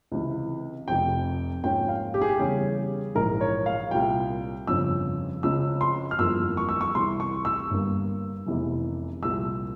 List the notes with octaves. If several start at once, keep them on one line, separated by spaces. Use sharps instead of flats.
C#2 C3 E3
F1 F2 C3 G5
G#2 F3 A#3 C#4 F4 G5
F5
G4
G#4
G4
E2 C#3 G3 C#4 G#4
A#1 G#2 E3 A#4
C#5
F5
C2 A#2 G3 G5
G1 F2 C#3 F3 E6
C#2 C#3 F3 C4 E6
C6
F6
G1 F2 E3 A#3 F4 E6
C#6
E6
C#6
C2 C3 E3 C6
C#6
E6
G1 G2 G3 A#3
F1 E2 C3 E3
C2 A#2 F3 E6